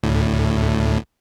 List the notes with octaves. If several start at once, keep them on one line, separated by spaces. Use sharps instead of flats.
D2 A2